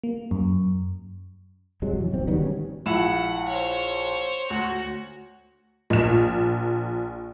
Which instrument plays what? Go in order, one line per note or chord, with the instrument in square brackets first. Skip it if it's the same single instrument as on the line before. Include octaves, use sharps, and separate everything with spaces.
[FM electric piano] A#3
F#2
[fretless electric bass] G2 C3 F#3 G#3
F2 E3 F#3
D1 B1 C4
D#3 F#3 G3 B3
G3 B3 C#4
[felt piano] A#1 E4 E7 [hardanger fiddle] F#5
[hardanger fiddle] C5 C#5
[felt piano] D2 [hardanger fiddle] F#4
[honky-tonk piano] A#1 E7